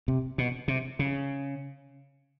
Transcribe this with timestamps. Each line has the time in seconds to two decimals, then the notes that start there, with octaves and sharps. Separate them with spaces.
0.08 C3
0.38 B2
0.68 C3
0.99 C#3